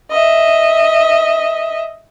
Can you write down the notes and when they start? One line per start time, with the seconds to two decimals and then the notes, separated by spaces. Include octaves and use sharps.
0.11 D#5 E5